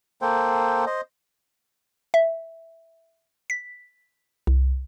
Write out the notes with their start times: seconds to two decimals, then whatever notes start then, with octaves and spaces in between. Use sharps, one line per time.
0.22 A#3 A4 C5 G5
0.86 C5 D#5
2.14 E5
3.50 B6
4.47 C2